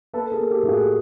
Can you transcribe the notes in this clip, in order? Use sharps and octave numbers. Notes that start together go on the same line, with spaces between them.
A#3 A4 B4
G#4 A#4
A#3
G4 A4
A2
F#4 G#4